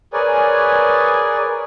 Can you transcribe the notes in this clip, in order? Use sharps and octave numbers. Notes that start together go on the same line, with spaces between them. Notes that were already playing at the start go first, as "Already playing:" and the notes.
G#4 A#4 B4 C#5 D5 G#5